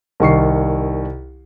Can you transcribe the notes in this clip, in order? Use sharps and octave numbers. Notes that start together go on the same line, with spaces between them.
C2 D#3 C#6 C7